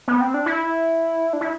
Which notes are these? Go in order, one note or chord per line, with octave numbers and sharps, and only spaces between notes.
B3
C4
D4
E4
D4
E4